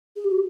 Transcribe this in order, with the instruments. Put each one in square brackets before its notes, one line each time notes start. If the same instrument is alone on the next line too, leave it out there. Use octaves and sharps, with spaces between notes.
[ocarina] G#4
G4
F#4